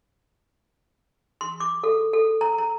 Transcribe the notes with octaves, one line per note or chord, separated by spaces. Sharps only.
C6
D6
A4
A4
A#5
A#5